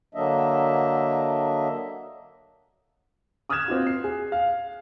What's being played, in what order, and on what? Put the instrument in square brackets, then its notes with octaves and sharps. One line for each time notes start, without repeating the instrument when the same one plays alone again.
[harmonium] D3 F#3 A#3 D4 D#5 E5
[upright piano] D6 D#6 F6 F#6 G#6 E7
C4 F4 F#4
C7
G#4
F5